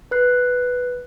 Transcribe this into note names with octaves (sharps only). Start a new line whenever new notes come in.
B4 F#6 C7